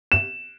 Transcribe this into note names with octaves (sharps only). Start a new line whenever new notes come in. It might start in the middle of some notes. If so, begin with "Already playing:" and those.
E7